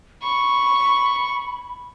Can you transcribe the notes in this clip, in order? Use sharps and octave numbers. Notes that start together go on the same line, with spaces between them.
B5 C#6